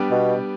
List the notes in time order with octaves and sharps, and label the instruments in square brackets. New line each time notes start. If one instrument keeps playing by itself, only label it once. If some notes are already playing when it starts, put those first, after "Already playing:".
Already playing: [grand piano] G3 B3 D4 G4
[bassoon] B2